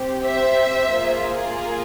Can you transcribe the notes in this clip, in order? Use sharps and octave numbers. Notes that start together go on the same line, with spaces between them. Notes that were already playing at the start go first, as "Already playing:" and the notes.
Already playing: C4 G4
C5 E5
A#3 F4 G#4